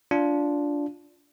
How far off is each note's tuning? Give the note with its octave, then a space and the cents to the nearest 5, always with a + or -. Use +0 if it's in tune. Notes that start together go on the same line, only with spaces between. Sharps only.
D4 -15 F4 +0